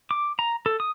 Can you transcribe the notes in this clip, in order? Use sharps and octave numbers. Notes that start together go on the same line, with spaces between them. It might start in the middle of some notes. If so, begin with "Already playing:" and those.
D6
A#5
A4
D#6